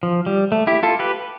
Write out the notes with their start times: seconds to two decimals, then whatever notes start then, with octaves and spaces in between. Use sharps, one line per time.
0.03 F3
0.26 G3
0.52 A3
0.67 E4 G4
0.83 F4 A4
0.99 G4 B4